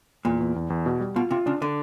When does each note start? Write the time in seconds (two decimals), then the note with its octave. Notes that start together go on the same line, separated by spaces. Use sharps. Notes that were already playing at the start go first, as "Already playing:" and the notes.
0.25 E2 A#2
0.40 E2
0.56 E2
0.70 E2
0.86 B2
1.00 G3
1.16 B2 F4
1.31 C3 F4
1.46 C#3 D4
1.61 D3 D4